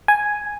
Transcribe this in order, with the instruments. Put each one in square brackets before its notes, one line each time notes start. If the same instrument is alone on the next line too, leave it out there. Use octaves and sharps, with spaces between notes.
[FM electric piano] G#5